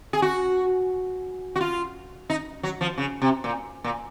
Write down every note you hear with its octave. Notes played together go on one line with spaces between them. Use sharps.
G#4
F#4
F#4
F4
D#4
F#3
F3
C#3
C3
A#2
A#2